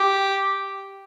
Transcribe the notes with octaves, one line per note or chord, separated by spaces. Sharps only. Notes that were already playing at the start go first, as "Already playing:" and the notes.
Already playing: G4